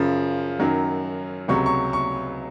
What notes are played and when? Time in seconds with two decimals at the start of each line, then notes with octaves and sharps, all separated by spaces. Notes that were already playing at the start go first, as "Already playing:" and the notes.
Already playing: F#2 C#3 F3
0.60 F#2 D#3 F#3
1.48 C#2 C3 F#3 C#6
1.66 C#6
1.93 C#6